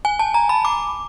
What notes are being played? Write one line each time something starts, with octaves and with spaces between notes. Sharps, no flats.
G#5
A5
A#5
B5
D6